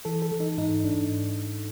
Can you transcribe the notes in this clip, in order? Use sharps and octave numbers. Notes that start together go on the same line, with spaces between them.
E3 A4
A4
E3
D#4
G#2 D#4
G#2 D4